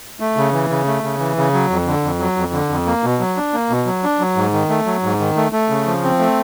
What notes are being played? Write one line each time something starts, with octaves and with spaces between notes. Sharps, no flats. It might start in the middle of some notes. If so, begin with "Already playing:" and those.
A3
C#3
E3
C#3
A3
C#3
E3
C#3
F#3
F2
D3
F2
F#3
F2
D3
F2
A#3
B2
F#3
D4
A#3
B2
F#3
D4
F#3
G#2
D#3
A3
F#3
G#2
D#3
A3
A3
C#3
F3
C4
A3